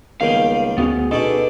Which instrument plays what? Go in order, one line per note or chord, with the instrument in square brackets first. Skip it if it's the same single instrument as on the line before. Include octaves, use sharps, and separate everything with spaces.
[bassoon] C#2 [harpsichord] D#3 G3 [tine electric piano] A#3 B3 [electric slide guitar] F5
[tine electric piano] D2 F#4 G#4 [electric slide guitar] B3 C#4
[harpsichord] B2 D4 [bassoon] D#4 [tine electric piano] F#4 G#4 [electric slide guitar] A4